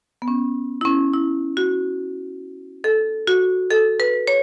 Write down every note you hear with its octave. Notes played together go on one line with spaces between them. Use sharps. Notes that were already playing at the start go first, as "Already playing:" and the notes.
B3
C#4
E4
C#4
E4
F#4
A4
F#4
A4
B4
C#5